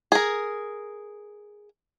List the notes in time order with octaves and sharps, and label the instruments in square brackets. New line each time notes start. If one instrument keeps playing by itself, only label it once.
[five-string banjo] G#4 A#4